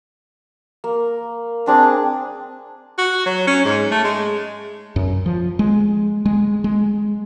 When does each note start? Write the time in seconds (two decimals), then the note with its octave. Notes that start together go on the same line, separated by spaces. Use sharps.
0.84 A#3
1.67 C4 D4 G#4
2.98 F#4
3.26 F#3
3.47 C#4
3.65 G#2
3.91 A3
4.04 G#3
4.96 F#2
5.26 F3
5.59 G#3
6.26 G#3
6.64 G#3